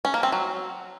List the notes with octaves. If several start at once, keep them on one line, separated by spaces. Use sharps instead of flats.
C#4
A#3
C4
F#3